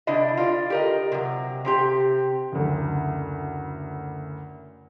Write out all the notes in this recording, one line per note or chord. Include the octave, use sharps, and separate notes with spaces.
C3 D4 E4 D#5
F4 D5
G4 A#4 D#5
C3 F#3
C3 C4 G4
F#1 D2